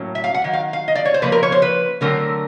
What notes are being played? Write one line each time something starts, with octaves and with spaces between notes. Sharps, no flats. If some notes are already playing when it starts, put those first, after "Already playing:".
Already playing: A2 F#3 A#3 C#4
E5
F5
F#5
D#3 F#3
F5
F5
D#5
D5
C#5
C5
C#3 F3 A#3 B4
A#4
C#5
C5
B4
D3 F#3 A3 C4 A#4